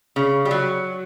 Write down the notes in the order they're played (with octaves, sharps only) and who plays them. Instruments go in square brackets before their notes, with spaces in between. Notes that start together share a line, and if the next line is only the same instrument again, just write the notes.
[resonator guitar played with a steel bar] C#3
G3
F#3